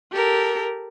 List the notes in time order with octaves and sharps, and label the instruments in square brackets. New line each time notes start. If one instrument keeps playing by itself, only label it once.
[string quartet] G4 A4 A#4